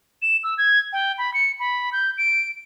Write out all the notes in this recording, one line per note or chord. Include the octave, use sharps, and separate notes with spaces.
E7
E6
G#6
G5
B5
C#7
B5
G6
D7